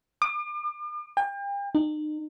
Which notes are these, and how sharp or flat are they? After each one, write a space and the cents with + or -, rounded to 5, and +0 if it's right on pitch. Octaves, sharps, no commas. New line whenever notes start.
D6 +40
G5 +40
D#4 -35